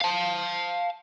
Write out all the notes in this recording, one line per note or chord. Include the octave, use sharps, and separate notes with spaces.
F5 A5